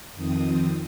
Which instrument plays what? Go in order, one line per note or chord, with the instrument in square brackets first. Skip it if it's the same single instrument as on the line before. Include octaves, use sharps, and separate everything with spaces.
[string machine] F2 D#3 F3 C4 D#6